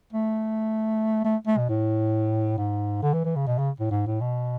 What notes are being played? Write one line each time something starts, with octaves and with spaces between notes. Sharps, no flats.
A3
A3
A3
B2
A2
G#2
D3
E3
E3
C#3
B2
C#3
A2
G#2
A2
B2